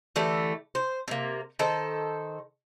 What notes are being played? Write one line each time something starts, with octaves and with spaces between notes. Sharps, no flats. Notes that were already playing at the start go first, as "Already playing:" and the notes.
D3 E3 A3 G4
C5
C3 A#3
D#3 A4 C5